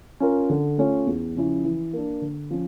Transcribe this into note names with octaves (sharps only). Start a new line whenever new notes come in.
C#4 F4 A#4
D3
A3 C#4 F4 C#5
E2
C#3 F3 C#4 E4
E3
A#3 D4
D3
F3 C#4